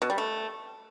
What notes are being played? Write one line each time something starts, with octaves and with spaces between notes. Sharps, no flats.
B2
G3
A3